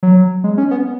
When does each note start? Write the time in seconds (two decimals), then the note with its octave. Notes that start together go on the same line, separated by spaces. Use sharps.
0.03 F#3
0.44 G#3
0.58 C#4
0.71 B3